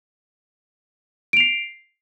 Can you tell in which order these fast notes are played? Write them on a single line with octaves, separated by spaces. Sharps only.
D7 F7 C7